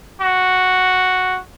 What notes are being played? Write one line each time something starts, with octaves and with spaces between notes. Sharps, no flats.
F#4